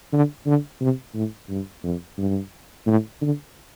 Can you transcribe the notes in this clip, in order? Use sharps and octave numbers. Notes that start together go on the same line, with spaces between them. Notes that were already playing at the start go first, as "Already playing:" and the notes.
D3
D3
C3
A2
G2
F2
G2
A2
D3